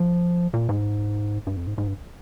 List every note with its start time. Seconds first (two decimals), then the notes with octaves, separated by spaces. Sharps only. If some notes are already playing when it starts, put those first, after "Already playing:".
Already playing: F3
0.54 A#2
0.69 G#2
1.47 G2
1.57 F2
1.67 G#2
1.78 G#2
1.88 G2